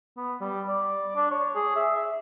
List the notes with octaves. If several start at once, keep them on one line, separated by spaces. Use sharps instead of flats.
B3
G3
D5
D4
C#5
G#4
E5
E5